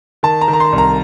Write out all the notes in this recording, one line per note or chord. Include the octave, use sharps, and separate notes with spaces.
D#3 A5
A#5
D#3
A#5
C6
C2
A#5